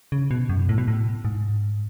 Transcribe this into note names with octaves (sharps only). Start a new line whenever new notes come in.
C#3
B2
F#2
A2
B2
A2
G#2